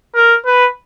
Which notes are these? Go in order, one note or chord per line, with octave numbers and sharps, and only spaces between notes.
A#4
B4